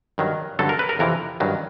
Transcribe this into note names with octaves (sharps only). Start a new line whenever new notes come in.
G2 D#3 F#3
G2 D3 F#3 A4
A#4
B4
A#4
F2 C3 E3 A#4
G2 D#3 F#3